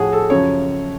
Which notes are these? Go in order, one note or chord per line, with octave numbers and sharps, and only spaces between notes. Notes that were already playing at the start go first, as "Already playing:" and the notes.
Already playing: A2 F3 F#4 G#4
A4
F#2 C#3 F3 C#5